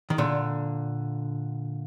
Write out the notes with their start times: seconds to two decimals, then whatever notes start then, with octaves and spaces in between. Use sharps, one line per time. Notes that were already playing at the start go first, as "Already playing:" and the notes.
0.10 D#3
0.18 A#2 D3